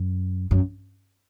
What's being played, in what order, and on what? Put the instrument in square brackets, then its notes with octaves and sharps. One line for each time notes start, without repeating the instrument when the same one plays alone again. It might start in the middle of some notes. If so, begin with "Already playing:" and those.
Already playing: [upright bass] F#2
F#2